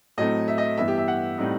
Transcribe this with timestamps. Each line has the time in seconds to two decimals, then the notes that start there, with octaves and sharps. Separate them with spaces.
0.18 A2 F#3 A3 C4 D#5
0.48 E5
0.58 D#5
0.77 G2 E3 B3 E5
0.88 G4
0.98 E5
1.08 F#5
1.38 A2 G3 C4 D#4